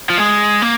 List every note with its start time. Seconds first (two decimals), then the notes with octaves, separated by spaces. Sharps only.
0.09 F3
0.18 G#3
0.62 A#3